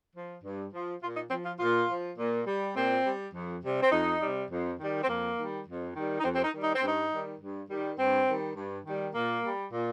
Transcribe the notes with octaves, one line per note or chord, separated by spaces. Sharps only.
F3
G2
F3
A#2 F4
D#4
F3 C4
F4
A#2 F4
F3
A#2
G3
A#2 C4
G3
F2
C3 G3
C4
F2 D#4
C3 G3
F2
D#3 G3
C4
F2 A#3
D#3 G3
F2
D#3 G3
D#4
F2 C4
C4
D#4
D#3 G3
D#4
C4
G2 D#4
D#3 G3
G2
D#3 G3
G2 C4
D#3 G3
G2
D#3 G3
A#2 A#3
G3
A#2